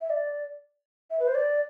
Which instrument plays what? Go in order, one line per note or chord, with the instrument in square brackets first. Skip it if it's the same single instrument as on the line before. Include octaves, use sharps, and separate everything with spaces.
[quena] E5
D5
E5
B4
C5
D5